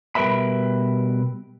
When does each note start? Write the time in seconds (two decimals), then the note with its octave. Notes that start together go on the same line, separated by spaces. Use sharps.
0.15 B2 G3 A#4 B4 E5 B5